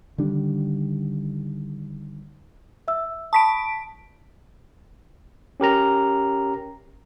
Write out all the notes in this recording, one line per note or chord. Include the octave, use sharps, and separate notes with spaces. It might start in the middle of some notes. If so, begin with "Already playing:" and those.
D3 D#3 G3 D4
E5 E6
A5 B5 C#6 D#6 B6 D7
C#4 G4 A#4 A#5